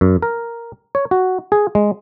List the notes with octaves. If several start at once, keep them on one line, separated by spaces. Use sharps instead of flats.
F#2
A#4
C#5
F#4
G#4
G#3